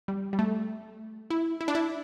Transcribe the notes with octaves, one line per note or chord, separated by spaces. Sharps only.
G3
G3
A3
E4
E4
D4
E4